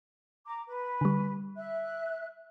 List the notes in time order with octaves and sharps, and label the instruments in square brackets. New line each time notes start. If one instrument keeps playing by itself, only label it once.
[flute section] A#5 D6
B4
[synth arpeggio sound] D3 G3
[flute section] E5 F#6